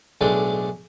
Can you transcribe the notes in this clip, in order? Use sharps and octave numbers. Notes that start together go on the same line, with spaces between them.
B1 A2 G#3 D4 A4